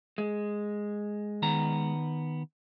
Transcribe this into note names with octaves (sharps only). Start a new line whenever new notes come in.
G#3
D#3 B3 A#5